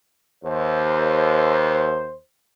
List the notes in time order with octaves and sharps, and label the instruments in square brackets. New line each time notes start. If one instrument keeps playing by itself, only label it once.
[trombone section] D#2 C5